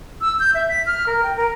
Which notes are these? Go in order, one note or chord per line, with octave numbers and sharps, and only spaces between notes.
E6
G6
E5
B6
F6
A#4
G5
A#4